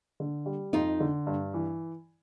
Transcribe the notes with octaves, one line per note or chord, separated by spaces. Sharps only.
D3
G3
F2 D#4 F4
D3
G2
E3